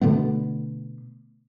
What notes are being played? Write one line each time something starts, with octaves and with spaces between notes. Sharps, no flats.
B2 D3 A3 B3